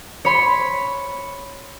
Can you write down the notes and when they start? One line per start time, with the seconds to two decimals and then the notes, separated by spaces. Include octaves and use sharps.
0.25 C#5 B5 C6